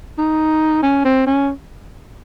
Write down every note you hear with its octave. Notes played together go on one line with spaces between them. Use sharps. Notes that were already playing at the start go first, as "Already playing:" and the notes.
D#4
C#4
C4
C#4